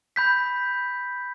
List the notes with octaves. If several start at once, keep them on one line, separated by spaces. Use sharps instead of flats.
B5 G6 B6